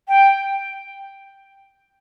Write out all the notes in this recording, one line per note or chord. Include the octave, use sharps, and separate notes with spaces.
G5